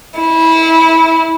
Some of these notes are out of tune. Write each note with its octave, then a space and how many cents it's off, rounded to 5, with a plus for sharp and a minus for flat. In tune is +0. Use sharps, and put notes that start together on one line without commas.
E4 -20